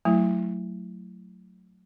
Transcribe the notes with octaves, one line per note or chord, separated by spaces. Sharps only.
F#3 A3 E4